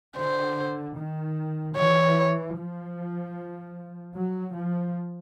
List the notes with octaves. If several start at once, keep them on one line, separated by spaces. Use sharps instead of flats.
D3 C5
D#3
E3 C#5
F3
F#3
F3